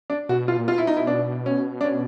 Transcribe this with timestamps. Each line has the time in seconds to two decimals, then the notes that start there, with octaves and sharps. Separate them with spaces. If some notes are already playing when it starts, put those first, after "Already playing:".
0.10 D4
0.29 B2 F#4
0.48 F4
0.58 A#2
0.68 B2 F4
0.78 E4
0.87 D#4
0.97 E4
1.07 D4
1.46 C#4
1.81 D4
1.85 C#4